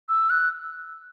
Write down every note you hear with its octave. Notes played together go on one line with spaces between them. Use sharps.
E6
F#6